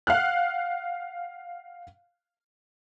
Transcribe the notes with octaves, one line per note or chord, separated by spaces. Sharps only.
F5 F#5 F6 F#6